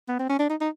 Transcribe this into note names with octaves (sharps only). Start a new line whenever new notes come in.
B3
C4
C#4
D4
D#4
D#4